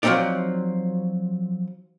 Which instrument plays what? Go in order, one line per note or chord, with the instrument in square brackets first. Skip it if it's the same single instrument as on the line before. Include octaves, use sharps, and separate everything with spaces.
[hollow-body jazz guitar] F3 F#3 A#3 C4 D#4 D5